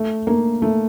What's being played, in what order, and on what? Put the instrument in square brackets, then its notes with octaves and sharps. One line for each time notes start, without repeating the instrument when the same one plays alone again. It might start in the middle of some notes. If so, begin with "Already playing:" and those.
Already playing: [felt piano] A3
A#3
A3